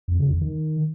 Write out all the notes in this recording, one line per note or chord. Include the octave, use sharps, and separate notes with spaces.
F2
C#3
E2
D#3